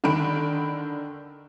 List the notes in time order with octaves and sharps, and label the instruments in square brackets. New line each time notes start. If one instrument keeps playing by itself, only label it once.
[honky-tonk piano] D3 D#3 B5 D7